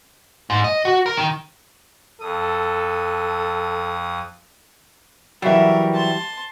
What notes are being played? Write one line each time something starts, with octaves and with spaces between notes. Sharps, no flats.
G#2
D#5
F#4
A#4
D#3
F2 A4 D#6
E3 F#3 G3 A#4 E5
A5 C6